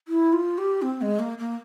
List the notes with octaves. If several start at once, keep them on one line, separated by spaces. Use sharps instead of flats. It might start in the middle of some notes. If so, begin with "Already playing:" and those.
E4
F4
G4
C4
G#3
A#3
A#3